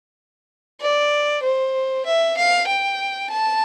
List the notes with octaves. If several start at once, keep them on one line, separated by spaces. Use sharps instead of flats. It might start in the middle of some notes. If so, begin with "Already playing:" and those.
D5
C5
E5
F5
G5
A5